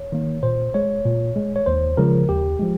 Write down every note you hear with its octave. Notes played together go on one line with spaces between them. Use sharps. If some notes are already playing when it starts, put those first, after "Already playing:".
Already playing: C#5
D#3 A#3
A#2 C5
G#3 C#5
A#2
G#3
C#5
D#2 C5
C#3 F3 G#3 A#4
D#2 G4
F3 G#3